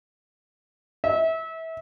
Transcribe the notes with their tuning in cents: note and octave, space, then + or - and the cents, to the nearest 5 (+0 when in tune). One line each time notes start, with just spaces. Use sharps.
E5 -25